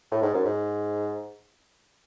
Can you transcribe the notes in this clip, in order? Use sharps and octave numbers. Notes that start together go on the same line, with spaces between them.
A2
G#2
F#2
G#2